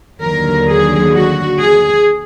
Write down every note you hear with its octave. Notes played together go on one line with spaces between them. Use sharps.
D#2 D3 F#3 A#4
G#4
F#4
G#4